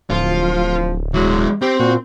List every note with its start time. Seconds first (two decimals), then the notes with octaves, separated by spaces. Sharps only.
0.10 D1 F3 F4
1.14 E3 F#3 G#3
1.62 C4 G4
1.80 A#2 F#4